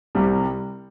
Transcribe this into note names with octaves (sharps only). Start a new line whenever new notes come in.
C2 C3 G3